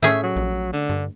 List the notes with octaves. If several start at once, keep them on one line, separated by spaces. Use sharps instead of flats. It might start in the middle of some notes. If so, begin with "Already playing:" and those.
A2 A3 C#4 G#4 E5
F#3
A#1
D3
G2